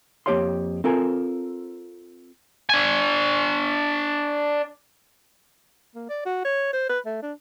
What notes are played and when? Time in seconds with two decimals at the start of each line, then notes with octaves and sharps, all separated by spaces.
0.26 F2 A#3 G4 C#5 F5 C6
0.84 C4 F4 A4 A#4 C5 G#5
2.70 D4 G#5
5.95 A#3
6.09 D5
6.26 F#4
6.45 C#5
6.73 C5
6.89 B4
7.06 A3
7.22 D4